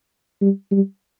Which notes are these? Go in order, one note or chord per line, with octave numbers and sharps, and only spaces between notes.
G3
G3